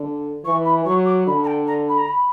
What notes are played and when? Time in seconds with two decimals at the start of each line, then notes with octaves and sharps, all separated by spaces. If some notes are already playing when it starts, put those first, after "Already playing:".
Already playing: D3
0.44 E3 C#6
0.65 B5
0.85 F#3 C#6
1.05 D6
1.27 D3 B5
1.43 A#5
1.46 G5
1.67 A#5
1.88 B5
1.97 A#5
2.08 B5